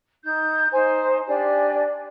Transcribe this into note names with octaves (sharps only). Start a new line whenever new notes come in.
D#4 G6
D#4 C5 G#5
D4 G4 D5 G#5